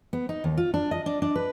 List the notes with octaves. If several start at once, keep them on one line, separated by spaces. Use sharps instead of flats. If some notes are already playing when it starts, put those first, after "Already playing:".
B3
D#4
D#2
F4
D4
D#5
D4
D4
B4